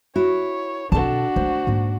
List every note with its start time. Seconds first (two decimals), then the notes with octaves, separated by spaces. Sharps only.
0.16 E4 F#4 C#5
0.92 B2 C4 D4 F#4 A4 A5
1.36 A3 C5
1.67 G#2 A#3